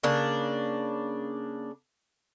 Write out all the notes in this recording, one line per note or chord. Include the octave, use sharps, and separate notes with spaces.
C#3 A#3 D4